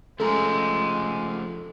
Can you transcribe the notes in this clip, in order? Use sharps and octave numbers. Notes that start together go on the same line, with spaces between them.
F3 G#3 A3 C#4 G#4 A4 A#5